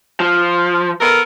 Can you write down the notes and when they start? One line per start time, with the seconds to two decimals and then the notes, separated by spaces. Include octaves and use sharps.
0.20 F3
1.01 B3 A4 A#4